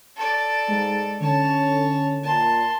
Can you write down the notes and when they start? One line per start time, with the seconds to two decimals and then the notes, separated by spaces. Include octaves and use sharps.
0.16 A4 D5
0.68 G#2 G#3
1.20 D3 C#4 C#5 A5
2.23 A#2 A5 C6